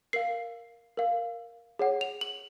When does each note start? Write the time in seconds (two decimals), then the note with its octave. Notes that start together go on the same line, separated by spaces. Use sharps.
0.13 A#4 F5 C7
0.97 A#4 F5
1.79 G#4 C#5 F#5
2.01 F7
2.21 F#7